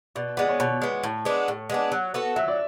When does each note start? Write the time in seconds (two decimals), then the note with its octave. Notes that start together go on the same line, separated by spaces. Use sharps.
0.15 B2 D5
0.37 G#3 B3 D5
0.49 C#5
0.59 B2 C#5
0.82 G#3 B3
1.03 A2
1.25 G#3 B3 D4
1.48 A2
1.70 G#3 B3 D4
1.92 F#3
2.14 B3 F#4 A4
2.36 F#3 E5
2.48 D5